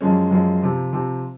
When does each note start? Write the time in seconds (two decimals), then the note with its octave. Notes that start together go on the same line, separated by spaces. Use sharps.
0.01 F#2 F3 G#3 C#4
0.31 F#2 F3 G#3 C#4
0.62 C3 F3 C4
0.93 C3 F3 C4